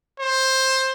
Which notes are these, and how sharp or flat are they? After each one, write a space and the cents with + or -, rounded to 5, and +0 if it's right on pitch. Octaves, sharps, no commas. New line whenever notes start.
C5 +15